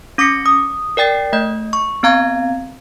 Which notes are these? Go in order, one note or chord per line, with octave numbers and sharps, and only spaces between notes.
C#4 D6 A#6 B6 C#7
D#6
A#4 D5 G5 A6 C7
A3 D#5 G6
C#6
B3 C4 F5 A#5 G#6